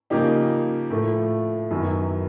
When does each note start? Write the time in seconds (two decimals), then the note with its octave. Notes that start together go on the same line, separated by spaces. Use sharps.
0.10 C#3 F3 A#3 D#4 G4
0.90 A2 F3 A3
1.71 F#2 D#3 F#3 B3 E4